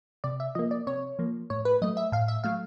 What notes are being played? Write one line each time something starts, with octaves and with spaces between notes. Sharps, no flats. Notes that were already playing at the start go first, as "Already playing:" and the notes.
C3 D5
E5
F3 A#3 D#5
D5
C3 C#5
F3 A#3
A2 C#5
B4
F#3 A3 D#5
E5
A2 F5
E5
F#3 A3 F5